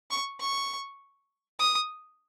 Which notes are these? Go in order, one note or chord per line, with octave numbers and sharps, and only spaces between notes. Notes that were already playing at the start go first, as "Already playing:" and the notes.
C#6
C#6
D#6